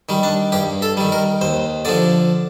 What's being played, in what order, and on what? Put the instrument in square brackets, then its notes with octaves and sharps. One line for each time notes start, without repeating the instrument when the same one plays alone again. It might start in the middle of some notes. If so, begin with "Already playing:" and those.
[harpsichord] D#3 G3
D4
G2 G4
A4
D#3 G3
A#4
D#2 C5
D3 F3 D5